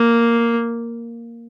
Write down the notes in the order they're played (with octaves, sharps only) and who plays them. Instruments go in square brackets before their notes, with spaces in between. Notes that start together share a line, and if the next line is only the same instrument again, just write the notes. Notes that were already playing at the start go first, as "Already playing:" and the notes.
Already playing: [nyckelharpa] A#3